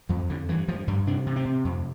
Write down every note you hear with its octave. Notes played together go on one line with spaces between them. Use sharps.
F2 F3
F2 D3
G2 E3
G2 F3
G2 G3
C3 D4
C3
C4
C3
F2